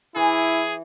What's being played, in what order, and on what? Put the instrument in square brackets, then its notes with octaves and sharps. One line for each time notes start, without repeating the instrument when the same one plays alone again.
[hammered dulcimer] E3 [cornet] E4 [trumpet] G#4